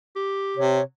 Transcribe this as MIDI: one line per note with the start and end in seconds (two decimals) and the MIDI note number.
0.16 0.64 67
0.57 0.80 48
0.57 0.83 73